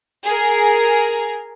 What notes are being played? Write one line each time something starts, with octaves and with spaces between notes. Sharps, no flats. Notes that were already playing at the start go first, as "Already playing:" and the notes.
G#4 A#4